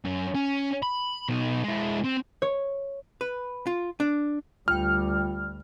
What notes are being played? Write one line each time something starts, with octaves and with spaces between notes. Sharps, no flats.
F#2
C#4
B5
B2 D#4
G#3 E4
C4
C#5
B4
F4
D4
D2 G3 F4 G5 F6